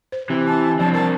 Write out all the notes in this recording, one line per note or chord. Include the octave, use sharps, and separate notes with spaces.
C5
C3 E3
A5
F3 C4 D4 A5
A#4 A5 A#5